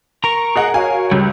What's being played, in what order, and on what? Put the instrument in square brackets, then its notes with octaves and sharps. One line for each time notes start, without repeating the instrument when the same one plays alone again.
[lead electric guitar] A#4 A#5 [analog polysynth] C#6
[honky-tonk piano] G#4 D#5 F#5
[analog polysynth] F#4 C#5 [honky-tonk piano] F5 G#5
[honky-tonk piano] C#2 [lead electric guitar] G3